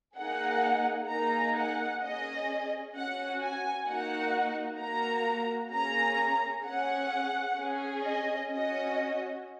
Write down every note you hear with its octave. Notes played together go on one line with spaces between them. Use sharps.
A#3 D#4 G#4 F#5
A#3 D#4 G#4 A#5
F#5
C#4 G#4 D#5
C#4 F#4 F#5
G#5
A#3 D#4 F#4 F#5
A#3 F#4 A#5
A#3 C#4 G#4 A#5
C#4 G#4 F#5
C#4 G#4
D#5
C#4 F#4 D#5